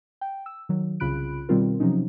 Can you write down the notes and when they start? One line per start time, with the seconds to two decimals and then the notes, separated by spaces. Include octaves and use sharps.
0.21 G5
0.46 E6
0.69 D#3 F#3
1.00 C2 C#3 F4 B5 F#6 D7
1.49 B2 D#3 G3 C4 F4 A#4
1.80 C3 F3 F#3 C#4 D#4